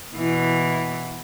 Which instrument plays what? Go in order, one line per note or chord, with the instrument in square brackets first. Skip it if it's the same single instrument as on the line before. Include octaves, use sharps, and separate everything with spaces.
[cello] B2 E3